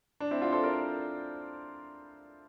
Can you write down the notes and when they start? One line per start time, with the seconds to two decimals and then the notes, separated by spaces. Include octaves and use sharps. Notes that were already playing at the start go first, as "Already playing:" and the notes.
0.20 D4
0.31 C4 E4
0.42 D4 F4
0.52 A4 C5
0.63 A#4 D5